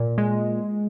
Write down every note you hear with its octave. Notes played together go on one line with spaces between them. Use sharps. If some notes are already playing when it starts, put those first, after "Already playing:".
Already playing: A#2
G#3